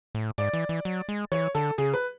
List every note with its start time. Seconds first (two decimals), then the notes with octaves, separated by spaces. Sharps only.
0.15 A2
0.38 G#2 D5
0.54 E3
0.69 E3
0.85 F#3
1.09 G#3
1.32 E3 C#5
1.55 D3 A4
1.78 C#3 G#4
1.93 B4